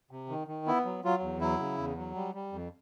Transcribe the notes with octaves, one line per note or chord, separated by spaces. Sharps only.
C3
D#3
D#3
B3 E4
F#3
F#3 F4
E2
F#3 E4
C#3
E2
F#3
G3
G3
F2